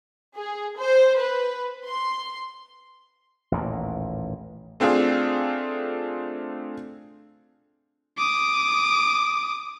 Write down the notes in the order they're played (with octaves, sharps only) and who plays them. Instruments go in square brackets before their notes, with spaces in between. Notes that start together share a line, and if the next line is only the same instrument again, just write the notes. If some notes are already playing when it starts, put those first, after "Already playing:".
[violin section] G#4
C5
B4
C6
[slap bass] A1 D#2 A#2
[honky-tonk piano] A3 C4 D4 F4 G#4
[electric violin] D6 D#6